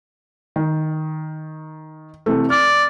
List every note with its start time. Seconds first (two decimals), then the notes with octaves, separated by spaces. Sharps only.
0.56 D#3
2.26 C3 E3 A3
2.50 D5 F6